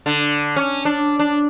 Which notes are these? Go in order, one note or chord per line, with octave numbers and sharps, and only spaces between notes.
D3
C#4
D4
D4